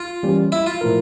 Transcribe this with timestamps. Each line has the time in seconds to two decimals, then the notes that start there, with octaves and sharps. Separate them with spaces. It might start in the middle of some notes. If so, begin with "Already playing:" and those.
Already playing: F4
0.23 E3 G3 A#3 C#4 G4
0.52 E4
0.66 F4
0.81 A#2 F3 A3 E4 A#4